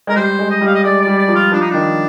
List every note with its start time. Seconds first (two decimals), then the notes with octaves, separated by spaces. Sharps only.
0.07 G#3 A#4
0.16 G3 C5
0.39 G#3
0.50 D#5
0.61 G3
0.66 F5
0.75 D#5
0.84 G#3 D5
1.01 D5
1.07 G3
1.18 D5
1.28 F3
1.35 F4
1.52 F3 D4
1.61 D#4
1.69 D#3 D4